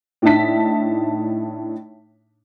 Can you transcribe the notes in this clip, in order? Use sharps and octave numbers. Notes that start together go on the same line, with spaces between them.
A2 D4 D#4 E5 A5 B6